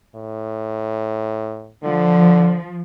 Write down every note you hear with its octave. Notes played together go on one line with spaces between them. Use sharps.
A2
D3 F3